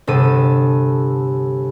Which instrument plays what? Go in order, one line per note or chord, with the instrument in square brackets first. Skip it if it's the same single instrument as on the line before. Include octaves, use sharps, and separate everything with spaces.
[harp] G1 C3 A4 D#7